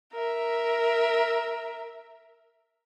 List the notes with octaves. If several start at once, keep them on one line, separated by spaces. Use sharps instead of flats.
A#4 E5